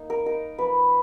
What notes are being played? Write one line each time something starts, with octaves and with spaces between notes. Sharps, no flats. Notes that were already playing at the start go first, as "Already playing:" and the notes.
Already playing: A#3 D#4
A#4
D#4 A#4
F3 B4